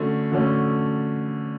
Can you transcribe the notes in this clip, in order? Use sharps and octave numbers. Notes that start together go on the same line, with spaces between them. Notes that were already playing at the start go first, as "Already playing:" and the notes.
Already playing: D3 A3 C#4 F#4
D3 A3 C#4 F#4